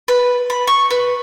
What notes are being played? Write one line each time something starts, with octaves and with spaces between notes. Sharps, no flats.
B4
B5
C#6
B4